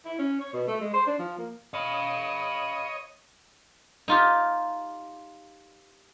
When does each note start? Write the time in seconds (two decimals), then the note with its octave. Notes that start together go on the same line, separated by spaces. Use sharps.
0.05 E4
0.19 C#4
0.40 C#5
0.53 B2
0.68 A3
0.80 G#3
0.93 C5
1.07 D4
1.19 F3
1.38 A#3
1.74 C#5 D#5 F5 B5
4.08 D#4 F4 G4